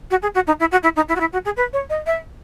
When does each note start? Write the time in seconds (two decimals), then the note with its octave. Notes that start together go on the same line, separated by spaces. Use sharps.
0.10 F#4
0.22 G#4
0.34 F#4
0.47 D#4
0.59 E4
0.71 F#4
0.83 E4
0.96 D#4
1.08 E4
1.15 F#4
1.20 E4
1.32 F#4
1.45 G#4
1.56 B4
1.73 C#5
1.89 D#5
2.06 E5